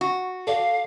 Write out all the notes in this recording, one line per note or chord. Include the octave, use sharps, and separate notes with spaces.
F#4
A4 D5 F5